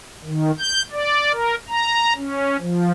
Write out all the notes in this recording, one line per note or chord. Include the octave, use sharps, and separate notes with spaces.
D#3
G6
D5
A#4
A#5
C#4
F3